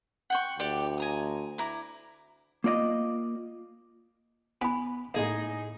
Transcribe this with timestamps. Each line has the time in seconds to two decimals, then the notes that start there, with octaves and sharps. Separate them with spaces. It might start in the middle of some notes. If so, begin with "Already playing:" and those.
0.30 F#5 G5 C#6
0.59 D2 G4 D5 D6
0.98 G#5 A#5 D#6
1.58 E4 A#5 D6
2.64 A#3 F4 D5 D#5
4.61 B3 B4 G#5 B5
5.14 A2 G#3 A#3 D#4 G#4 D#5